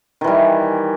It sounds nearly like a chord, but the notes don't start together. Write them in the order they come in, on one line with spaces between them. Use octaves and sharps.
D#3 E3 G3